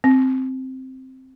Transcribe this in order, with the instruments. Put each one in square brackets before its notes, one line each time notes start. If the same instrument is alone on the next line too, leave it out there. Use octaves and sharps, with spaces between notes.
[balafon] C4